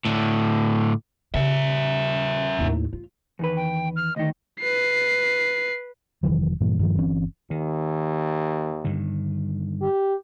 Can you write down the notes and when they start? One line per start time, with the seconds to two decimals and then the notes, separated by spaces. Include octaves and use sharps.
0.05 A2 D3
1.34 C#3 A#4 E5
2.59 D#2 A2
2.93 F4
3.39 E2 D#3 B4
3.57 G5
3.96 F6
4.16 D2 D#3 D#5
4.60 B4 C7
6.23 F1 D#3 E3 F#3
6.61 G2 A#2 E3
6.79 G2 D#3 F3
6.98 G1 E3 C4 C#4
7.51 D#2 D#3
8.85 G2 D3 D#3
9.82 G4